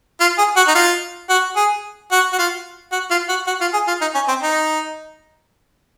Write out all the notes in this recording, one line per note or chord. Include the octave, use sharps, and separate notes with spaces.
F4
G#4
F#4
D#4
F4
F#4
G#4
F#4
F#4
F4
F#4
F4
F#4
F#4
F4
G#4
F4
D#4
C#4
C4
D#4